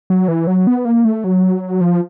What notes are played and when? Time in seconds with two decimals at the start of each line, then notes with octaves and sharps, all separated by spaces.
0.10 F#3
0.28 E3
0.47 F#3
0.67 B3
0.85 A#3
1.05 A3
1.24 F#3
1.81 F3